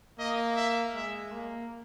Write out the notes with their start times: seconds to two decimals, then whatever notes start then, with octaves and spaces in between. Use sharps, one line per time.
0.19 A#3 D#5
0.57 E5
0.95 G#3 E5
1.32 A#3